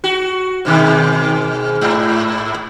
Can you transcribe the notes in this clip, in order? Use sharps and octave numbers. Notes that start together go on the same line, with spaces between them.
F#4
G#2 B2 D#3
G#2